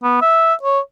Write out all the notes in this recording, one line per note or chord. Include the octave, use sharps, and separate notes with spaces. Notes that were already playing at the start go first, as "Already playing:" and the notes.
B3
E5
C#5